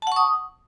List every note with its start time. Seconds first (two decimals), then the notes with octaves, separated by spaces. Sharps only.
0.02 A5
0.07 F#5
0.12 C#6
0.16 D#6